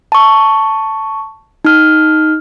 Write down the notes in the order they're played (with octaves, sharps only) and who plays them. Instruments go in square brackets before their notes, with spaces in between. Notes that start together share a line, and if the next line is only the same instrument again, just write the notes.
[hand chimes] A5 C#6
D#4 F6